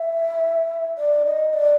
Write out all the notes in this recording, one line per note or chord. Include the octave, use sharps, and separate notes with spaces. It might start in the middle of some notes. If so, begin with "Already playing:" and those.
Already playing: E5
D5
D#5
D5